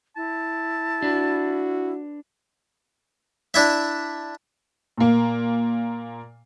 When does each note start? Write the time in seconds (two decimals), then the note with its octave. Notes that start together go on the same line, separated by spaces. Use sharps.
0.16 E4 A5
1.02 D4 F#4 B4
3.54 D4 E4 E5
4.98 A#2 A#3